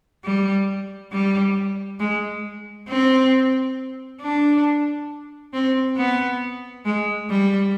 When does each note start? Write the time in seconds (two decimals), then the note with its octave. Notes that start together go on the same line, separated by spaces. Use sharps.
0.24 G3
1.12 G3
2.00 G#3
2.88 C4
4.21 D4
5.53 C4
5.97 B3
6.85 G#3
7.29 G3